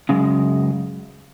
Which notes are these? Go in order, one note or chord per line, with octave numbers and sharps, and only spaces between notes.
F#2 C#3 G#3